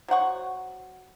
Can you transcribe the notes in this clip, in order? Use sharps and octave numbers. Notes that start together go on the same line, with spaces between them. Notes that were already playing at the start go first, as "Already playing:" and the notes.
F#3 C5 F#5 C#6